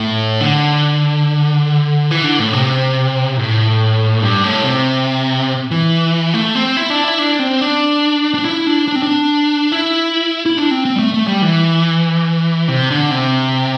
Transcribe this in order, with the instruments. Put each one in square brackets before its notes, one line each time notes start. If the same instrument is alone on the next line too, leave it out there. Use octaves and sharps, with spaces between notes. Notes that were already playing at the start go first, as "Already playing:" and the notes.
Already playing: [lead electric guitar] A2
D3
E3
D3
A2
C3
A2
G2
A2
C3
E3
A3
C4
E4
D4
E4
D4
C4
D4
D4
E4
D4
D4
C4
D4
E4
E4
D4
C4
C4
G3
A3
A3
G3
E3
C3
D3
C3